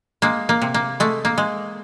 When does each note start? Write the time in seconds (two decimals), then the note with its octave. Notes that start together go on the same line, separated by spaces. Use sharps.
0.22 G#3 A#3
0.49 A#3
0.62 C3
0.74 A#3
1.00 G#3 A3
1.25 A#3
1.38 G#3